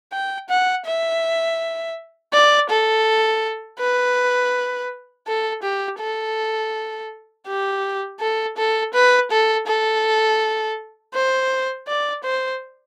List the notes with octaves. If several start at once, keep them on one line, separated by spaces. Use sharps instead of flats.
G5
F#5
E5
D5
A4
B4
A4
G4
A4
G4
A4
A4
B4
A4
A4
C5
D5
C5